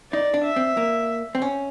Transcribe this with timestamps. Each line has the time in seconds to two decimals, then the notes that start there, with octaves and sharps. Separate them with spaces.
0.12 D#4 D5
0.34 D4
0.45 E5
0.56 C4
0.77 A#3
1.35 C4
1.42 C#4